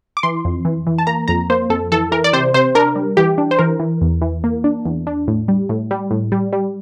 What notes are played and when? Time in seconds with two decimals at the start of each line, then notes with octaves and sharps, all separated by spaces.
0.17 D6
0.23 E3 C6
0.45 F2
0.65 E3
0.87 E3
0.98 A5
1.07 A#3 A#5
1.28 F2 A#5
1.50 A#3 C5
1.70 F2 A4
1.92 E3 A4
2.12 E3 A#4
2.24 D5
2.33 C3 C5
2.54 C3 C5
2.75 D4 A#4
2.96 G3
3.17 E3 G4
3.38 D4
3.51 C5
3.59 E3 A#4
3.80 E3
4.01 E2
4.22 E3
4.44 A#3
4.64 D4
4.86 E2
5.07 D4
5.28 A2
5.48 G3
5.69 A2
5.91 G3
6.11 A2
6.32 G3
6.53 G3